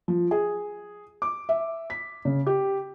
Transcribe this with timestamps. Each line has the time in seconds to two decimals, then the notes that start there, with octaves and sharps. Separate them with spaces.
0.08 F3
0.31 G#4
1.22 D6
1.49 E5
1.90 B6
2.25 C#3
2.47 G4